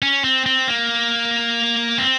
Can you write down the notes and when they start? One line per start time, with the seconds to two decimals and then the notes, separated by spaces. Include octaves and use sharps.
0.02 C#4
0.24 C4
0.46 C4
0.68 A#3
1.98 C4